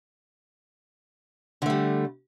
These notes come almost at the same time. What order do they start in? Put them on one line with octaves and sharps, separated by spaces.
D3 A3 G3